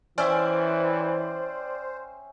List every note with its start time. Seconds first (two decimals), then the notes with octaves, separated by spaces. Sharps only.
0.18 E3 C#4 C5 D5 E5 G5